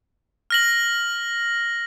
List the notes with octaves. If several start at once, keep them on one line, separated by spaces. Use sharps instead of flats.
F6 A#6 F#7